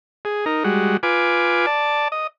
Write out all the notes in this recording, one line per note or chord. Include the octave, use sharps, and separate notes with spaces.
G#4
D#4 A#4
G3 G#3 F#4
F4 B4 G#5 D6
D5 A5
D#5